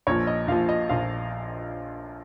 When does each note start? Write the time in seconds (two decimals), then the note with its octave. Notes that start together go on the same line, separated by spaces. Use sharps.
0.07 A#1 A#2 F3 C#5
0.27 D#5
0.48 A#1 A#2 F3 F5
0.69 D#5
0.89 A#1 A#2 F3 F5